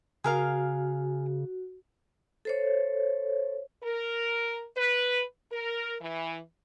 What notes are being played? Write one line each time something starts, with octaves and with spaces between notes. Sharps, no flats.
C#3 F#4 G#4 A#4 F5
A4 C5 C#5
A#4
B4
A#4
E3